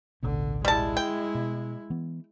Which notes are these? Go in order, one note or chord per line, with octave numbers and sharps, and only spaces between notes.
A1 D2 B2 D3
G3 G#3 E4 A5
G5
B2
E3 B3